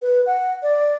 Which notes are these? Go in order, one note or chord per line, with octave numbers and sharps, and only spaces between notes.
B4
F#5
D5